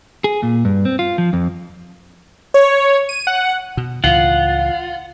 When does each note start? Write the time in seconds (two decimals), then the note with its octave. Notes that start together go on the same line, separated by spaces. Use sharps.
0.24 G#4
0.43 A#2
0.65 G2
0.85 C4
0.99 F4
1.18 F3
1.33 F2
2.54 C#5
3.09 D#7
3.27 F#5
3.77 B2
4.04 C#2 A2 E3 F4 F#5